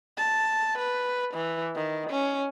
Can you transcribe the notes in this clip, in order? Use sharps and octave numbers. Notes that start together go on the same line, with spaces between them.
A5
B4
E3
D#3
C#4